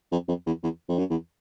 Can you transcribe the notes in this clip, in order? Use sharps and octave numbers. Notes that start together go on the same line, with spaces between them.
F2
F2
E2
E2
F2
F#2
E2